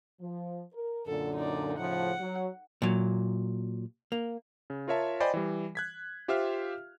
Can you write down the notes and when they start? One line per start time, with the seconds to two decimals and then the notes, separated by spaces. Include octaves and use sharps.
0.20 F3
0.73 A#4
1.06 F#2 A#2 D3 A4
1.35 D#4 D5
1.78 A2 C#3 F3 F#5
2.19 F#3
2.82 A#2 F#3
4.12 A#3
4.70 C#3
4.88 F4 A#4 C#5 E5 A5
5.20 C5 D5 D#5 G5 G#5 B5
5.34 E3 G3
5.75 F#6 G#6 B6
6.28 F4 G4 C5 E5 F5 F6